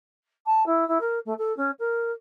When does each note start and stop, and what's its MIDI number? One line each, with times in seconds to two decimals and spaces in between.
0.46 0.65 81
0.66 0.87 64
0.88 0.98 64
1.00 1.19 70
1.25 1.33 57
1.38 1.55 69
1.57 1.71 61
1.79 2.11 70